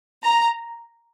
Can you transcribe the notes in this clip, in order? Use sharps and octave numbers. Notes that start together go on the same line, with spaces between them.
A#5